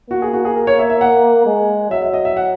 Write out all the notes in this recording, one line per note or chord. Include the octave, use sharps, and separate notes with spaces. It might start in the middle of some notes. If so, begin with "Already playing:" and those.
A#3 F#4
G#4
F#4
G#4
A#4
C#5
E5
E5
F#5
G#3
F#3 E5
E5
D#5
E5
F#5